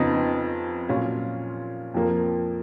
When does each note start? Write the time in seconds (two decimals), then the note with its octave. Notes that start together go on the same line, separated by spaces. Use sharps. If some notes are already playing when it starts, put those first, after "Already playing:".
Already playing: F2 C#3 F3 B3 D#4
0.89 A#2 F#3 C#4 F4
1.94 F2 F3 A#3